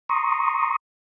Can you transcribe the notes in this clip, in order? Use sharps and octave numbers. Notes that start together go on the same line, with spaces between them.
A#5 C6 C#6 D#6